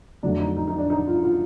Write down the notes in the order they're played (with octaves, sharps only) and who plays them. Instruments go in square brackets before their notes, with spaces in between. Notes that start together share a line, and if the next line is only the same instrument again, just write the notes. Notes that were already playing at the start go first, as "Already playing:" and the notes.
[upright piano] F2 D3 F#3 A3 D4
D#4
D#4
D#4
D4
D#4
F4
F4